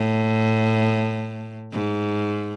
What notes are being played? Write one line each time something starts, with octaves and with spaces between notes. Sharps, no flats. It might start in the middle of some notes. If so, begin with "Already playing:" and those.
Already playing: A2
G#2